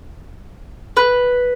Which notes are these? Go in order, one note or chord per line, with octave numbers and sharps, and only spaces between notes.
B4